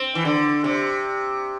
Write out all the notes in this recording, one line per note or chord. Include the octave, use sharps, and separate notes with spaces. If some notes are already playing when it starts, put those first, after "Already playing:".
Already playing: C4
E3
D3
C3